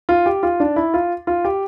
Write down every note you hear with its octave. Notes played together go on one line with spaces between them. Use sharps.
F4
G4
F4
D4
E4
F4
F4
G4